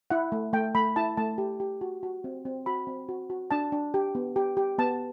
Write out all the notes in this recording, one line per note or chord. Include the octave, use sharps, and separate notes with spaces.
E4 F#5
A3
A3 G5
A3 B5
E4 A5
A3 A5
G4
G4
F#4
F#4
C4
C4
F#4 B5
C4
F#4
F#4
D4 A5
D4
G4
B3
G4
G4
B3 A5